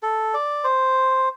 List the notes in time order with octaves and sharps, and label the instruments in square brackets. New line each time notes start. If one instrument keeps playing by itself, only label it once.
[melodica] A4
D5
C5